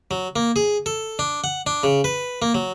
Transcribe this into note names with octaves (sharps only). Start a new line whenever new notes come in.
F#3
A#3
G#4
A4
D4
F#5
D4
C#3
B4
A#3
F#3